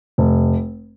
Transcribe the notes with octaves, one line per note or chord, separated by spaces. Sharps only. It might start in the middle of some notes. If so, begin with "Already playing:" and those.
F1